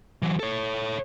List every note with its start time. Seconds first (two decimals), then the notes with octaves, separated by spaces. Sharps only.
0.22 E3 F#3
0.40 A4 C#5